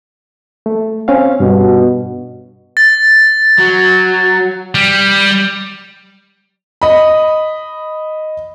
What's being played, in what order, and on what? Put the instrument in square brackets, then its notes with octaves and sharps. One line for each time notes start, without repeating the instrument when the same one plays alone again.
[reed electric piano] A3
C4 C#4 F5
[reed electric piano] G2 [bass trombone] B2
[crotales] A6
[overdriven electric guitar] F#3
[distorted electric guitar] G3
[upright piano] D#5 B5